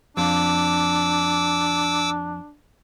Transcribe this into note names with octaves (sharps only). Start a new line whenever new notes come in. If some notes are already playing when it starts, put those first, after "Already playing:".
F2 D4 D6 E6